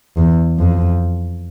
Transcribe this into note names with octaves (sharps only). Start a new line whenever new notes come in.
E2
F2